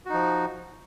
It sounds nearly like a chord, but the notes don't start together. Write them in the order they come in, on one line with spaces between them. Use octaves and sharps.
F#4 D#4 F3